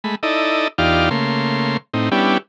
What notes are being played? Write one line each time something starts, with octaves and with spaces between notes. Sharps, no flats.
G#3 A3 B5
D#4 E4 A4 D5 D#5
E2 D#4 F4 G4 D5 F5
C#3 A3 A#3 C6
A2 C4 D#4
G3 B3 C#4 D4 E4 G4